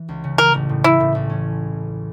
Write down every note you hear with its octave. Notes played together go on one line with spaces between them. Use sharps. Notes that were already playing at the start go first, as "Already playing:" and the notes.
Already playing: E3
C#2
C#3
E3 A#4
A1
A2
A1 E4
A2
A1
C#4